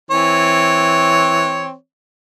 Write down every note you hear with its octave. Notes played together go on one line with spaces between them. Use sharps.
E3 C4 C#5